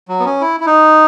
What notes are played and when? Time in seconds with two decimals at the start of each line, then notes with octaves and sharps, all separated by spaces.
0.08 F#3
0.20 B3
0.25 C#4
0.41 E4
0.60 E4
0.66 D#4